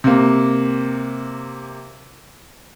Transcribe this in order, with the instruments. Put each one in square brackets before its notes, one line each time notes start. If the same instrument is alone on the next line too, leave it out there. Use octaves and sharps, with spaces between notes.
[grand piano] C3 A#3